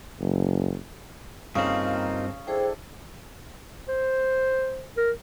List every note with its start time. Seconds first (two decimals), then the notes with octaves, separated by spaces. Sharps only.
0.21 F#1
1.56 G2 C#3 A#3 C4 D#4 F4
2.47 D4 E4 G#4 A4 C5 G5
3.88 C5
4.97 A#4